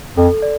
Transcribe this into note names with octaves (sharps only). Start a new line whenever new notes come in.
F2 A4
D5